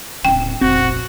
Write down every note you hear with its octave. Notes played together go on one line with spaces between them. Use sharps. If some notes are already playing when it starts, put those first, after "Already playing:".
D1 C#3 G5
F1 A#1 C4 F#4